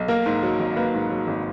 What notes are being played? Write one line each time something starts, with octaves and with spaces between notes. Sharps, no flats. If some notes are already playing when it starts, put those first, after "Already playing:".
Already playing: B1
A#3 A#4
G#2
F#3
G#1
A#3 B4
G#2
F#3
G#1